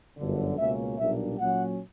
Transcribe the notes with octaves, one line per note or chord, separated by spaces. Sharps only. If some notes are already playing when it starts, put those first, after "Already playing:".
G1 F#2 D3
C#2 B2 A#3 C#4 E5
B1 A#2 G3 A#3 D4 E5
A#2 F#3 C#4 F#5